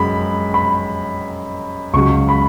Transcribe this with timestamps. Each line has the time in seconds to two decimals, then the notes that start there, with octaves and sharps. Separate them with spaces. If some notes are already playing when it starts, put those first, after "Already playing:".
Already playing: F#2 G#3 B5
0.54 B5
1.93 C#2 C#3 F#3 C#6
2.29 B5